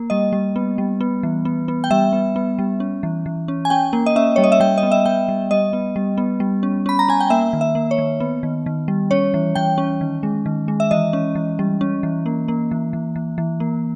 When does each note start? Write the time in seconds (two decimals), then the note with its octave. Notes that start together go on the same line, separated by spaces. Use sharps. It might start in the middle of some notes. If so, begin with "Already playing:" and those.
Already playing: A#3
0.10 G3 D#5
0.33 G3
0.56 B3
0.78 G3
1.01 B3
1.23 E3
1.45 B3
1.68 B3
1.84 G5
1.90 G3 E5
2.13 B3
2.36 B3
2.59 G3
2.80 C#4
3.03 E3
3.26 E3
3.48 C#4
3.65 G#5
3.70 C#4 G5
3.93 A#3
4.06 D#5
4.16 C#4 E5
4.36 G3 C#5
4.44 D#5
4.52 E5
4.60 G3 G5
4.78 D#5
4.83 B3
4.92 E5
5.06 B3 G5
5.29 G3
5.51 G3 D#5
5.73 B3
5.96 G3
6.18 B3
6.40 G3
6.63 C#4
6.86 C#4 B5
6.99 A#5
7.08 C#4 G#5
7.20 G5
7.30 A#3 E5
7.53 D#3
7.61 E5
7.75 A#3
7.91 C#5
7.98 D#3
8.20 B3
8.43 D#3
8.66 D#3
8.88 G3
9.11 C#4 C#5
9.34 E3
9.55 E3 G5
9.78 C#4
10.01 D#3
10.23 G#3
10.46 D#3
10.68 G#3
10.80 E5
10.91 E3 D#5
11.13 C#4
11.35 E3
11.59 G3
11.81 C#4
12.03 E3
12.26 A#3
12.48 A#3
12.71 E3
12.93 E3
13.16 E3
13.38 E3
13.60 A#3